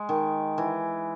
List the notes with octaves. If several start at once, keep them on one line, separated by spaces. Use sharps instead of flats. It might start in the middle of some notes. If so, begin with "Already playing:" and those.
Already playing: G#3
D#3
E3